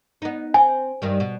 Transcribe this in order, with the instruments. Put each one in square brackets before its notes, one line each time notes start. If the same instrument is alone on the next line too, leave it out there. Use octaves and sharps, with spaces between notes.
[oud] B3 D#4
[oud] C4 [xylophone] G#5
[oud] G2 D#3 G3
B2